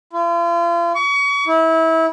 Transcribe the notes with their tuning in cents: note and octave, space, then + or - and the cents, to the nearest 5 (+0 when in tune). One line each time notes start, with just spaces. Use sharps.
F4 -40
C#6 +35
E4 -25